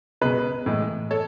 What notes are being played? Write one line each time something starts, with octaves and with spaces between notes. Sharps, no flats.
C#2 B2 G#3 G#4 B4
A2 E3 G#3
A4 C#5